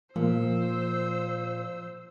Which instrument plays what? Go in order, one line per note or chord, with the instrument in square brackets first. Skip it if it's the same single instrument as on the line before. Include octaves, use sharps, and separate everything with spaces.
[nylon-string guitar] A#2 [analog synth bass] F3 [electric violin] C5 E6